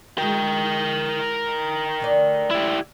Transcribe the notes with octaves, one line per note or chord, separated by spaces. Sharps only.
G#3 E4 F#4 A#4 G5
D2 D3 D5
E4 G4